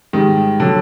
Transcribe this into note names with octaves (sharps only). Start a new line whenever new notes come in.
G#2 D#3 G3
D3 F#3